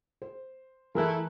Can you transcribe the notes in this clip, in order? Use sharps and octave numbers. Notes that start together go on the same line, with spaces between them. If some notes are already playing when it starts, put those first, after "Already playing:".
C5
E3 A3 E4 G#4 A#4 E6 F#6